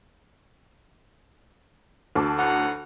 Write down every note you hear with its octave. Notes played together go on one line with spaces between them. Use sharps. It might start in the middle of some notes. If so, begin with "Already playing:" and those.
D2 A5 D6
A2 D#4 F#5